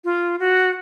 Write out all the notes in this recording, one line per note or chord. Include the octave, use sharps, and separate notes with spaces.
F4
F#4